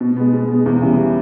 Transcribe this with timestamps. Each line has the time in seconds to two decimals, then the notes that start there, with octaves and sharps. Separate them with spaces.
0.01 B2
0.16 G#3 B3
0.33 B2
0.48 G#3 B3
0.66 E2
0.81 C#3 E3 G3 B3